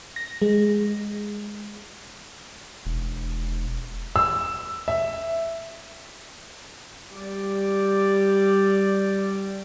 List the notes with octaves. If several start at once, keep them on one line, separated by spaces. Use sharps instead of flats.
A#6
G#3
E1
E6
E5
G3 D5